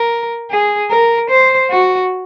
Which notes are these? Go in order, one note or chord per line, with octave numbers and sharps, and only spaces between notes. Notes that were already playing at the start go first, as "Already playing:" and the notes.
Already playing: A#4
G#4
A#4
C5
F#4